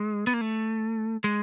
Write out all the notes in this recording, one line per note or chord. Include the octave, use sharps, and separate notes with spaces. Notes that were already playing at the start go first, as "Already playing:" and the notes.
Already playing: G#3
B3
A#3
A3
G#3